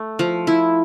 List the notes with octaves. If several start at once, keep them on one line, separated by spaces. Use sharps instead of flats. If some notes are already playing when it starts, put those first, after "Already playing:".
Already playing: A3
F3
E4